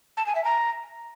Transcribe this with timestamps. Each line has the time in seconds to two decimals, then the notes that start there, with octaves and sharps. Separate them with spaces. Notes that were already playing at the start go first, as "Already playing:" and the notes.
0.17 A5
0.26 G#5
0.35 E5
0.44 A#5